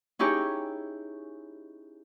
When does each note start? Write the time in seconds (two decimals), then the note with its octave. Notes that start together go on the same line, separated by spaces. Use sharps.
0.19 C#4 D#4 E4 G4 G#4 C#5